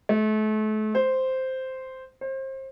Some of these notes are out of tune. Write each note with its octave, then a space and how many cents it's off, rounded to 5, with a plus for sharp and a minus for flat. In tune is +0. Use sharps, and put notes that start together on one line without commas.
A3 -35
C5 -5
C5 +30